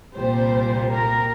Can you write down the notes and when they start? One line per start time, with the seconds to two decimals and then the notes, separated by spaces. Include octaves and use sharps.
0.16 C2 A#2 G3 C5
0.91 A#4